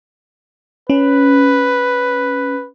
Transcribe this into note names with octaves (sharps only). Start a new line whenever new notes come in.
C#4 B4